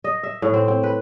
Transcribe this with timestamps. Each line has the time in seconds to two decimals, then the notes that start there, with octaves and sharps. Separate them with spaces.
0.04 D#5
0.23 E5
0.42 A2
0.54 C4
0.68 C4
0.83 B4